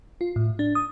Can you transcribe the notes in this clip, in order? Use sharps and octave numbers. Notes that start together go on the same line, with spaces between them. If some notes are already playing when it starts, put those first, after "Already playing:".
F4
A2
D4
D#6